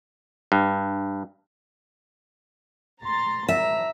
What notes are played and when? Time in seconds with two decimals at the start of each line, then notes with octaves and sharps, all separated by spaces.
0.52 G2
3.02 A#5 C6 A6
3.49 G#1 E5 A#5